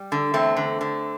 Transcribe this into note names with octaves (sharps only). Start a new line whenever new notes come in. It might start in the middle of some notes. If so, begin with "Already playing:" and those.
Already playing: G3
D3
E2 A3 C4
D3
D3